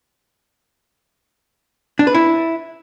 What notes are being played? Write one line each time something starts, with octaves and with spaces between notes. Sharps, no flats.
D4
B4
E4